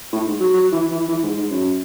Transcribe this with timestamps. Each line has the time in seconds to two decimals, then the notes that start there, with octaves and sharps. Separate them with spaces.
0.13 A2
0.26 G#2
0.40 F#3
0.54 F#3
0.72 E3
0.91 E3
1.09 E3
1.23 G#2
1.37 G#2
1.50 F#2